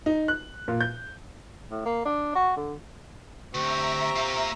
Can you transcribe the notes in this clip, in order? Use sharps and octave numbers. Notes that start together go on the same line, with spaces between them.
D#4
F#6
A#2
G6
A2
A#3
D4
F#4
D3
D2 C4 G4 E5 A#5 C#6
A#3 F4